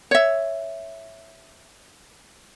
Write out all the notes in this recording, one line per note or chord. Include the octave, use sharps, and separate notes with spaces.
C#5 E5